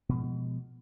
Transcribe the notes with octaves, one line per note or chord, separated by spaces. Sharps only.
B2 F3 G#3